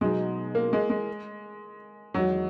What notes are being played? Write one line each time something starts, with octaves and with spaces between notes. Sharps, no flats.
B2 F#3 G#3 B3 D#4
A#3
G#3
G#3
E2 D#3 F#3 G#3 D#4 F#4